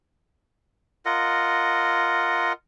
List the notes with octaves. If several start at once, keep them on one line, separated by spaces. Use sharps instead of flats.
F4 A#4 D#5 F#5